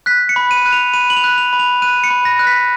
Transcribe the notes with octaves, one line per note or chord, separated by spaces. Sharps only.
F#6 B6
C#7
B5
D#7
F#6
F7
B5 D#7
F#7
F7
F#6
F7
B5
F7
F#6 D#7
C#7
B5
A#6
F#6
B6